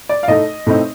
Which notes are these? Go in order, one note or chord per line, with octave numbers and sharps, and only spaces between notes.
D5
F5
A2 A3 D#4 D#5
A2 A3 C4 D#4